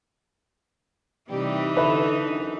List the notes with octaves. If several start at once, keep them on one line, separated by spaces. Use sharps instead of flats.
C3 E3 G3 D#4 G4
D3 A4 B4 E5
F#2